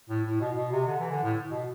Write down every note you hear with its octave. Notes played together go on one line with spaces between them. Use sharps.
A2
A2
B2
B2
C3
D3
E3
D3
A2
B2